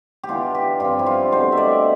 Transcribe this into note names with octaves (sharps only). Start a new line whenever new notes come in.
G4
E3 B3 D4 F4
G4
G2 F3 C4 F4
E4
F4
B2 A3 C4 C5
E5
D5